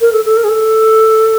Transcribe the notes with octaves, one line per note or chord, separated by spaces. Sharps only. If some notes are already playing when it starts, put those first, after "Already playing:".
A#4
A4
A4
A#4
G#4
A4